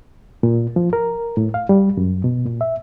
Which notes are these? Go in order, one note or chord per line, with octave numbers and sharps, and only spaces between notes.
A#2
F3
A#4
A2
F5
G3
F#2
B2
A#2
E5